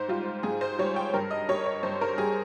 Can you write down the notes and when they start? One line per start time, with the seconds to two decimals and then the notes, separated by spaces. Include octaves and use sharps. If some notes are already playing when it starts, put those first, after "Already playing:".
Already playing: G#2 C5
0.08 G3 F4
0.43 G#2 G#4
0.61 C5
0.79 G3 C#5
0.96 G5
1.14 G2 A#4
1.31 D#5
1.49 G3 C#5
1.66 C#5
1.83 G2 C5
2.01 A#4
2.18 G3 G#4